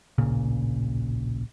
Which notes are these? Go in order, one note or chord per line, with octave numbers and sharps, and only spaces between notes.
D1 A#1 A#2 C#3